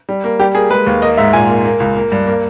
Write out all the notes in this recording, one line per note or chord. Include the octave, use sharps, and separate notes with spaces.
G3
A#3
G3 G4
A#3 G#4
G#3 B4
D#2
A#3 D#5
G#2 E5
A#2 G#5
A#3
A#3
C#2
A#3
G2
A#3